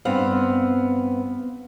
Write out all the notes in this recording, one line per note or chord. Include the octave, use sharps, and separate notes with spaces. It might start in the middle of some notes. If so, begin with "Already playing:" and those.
G2 B3 C4 F5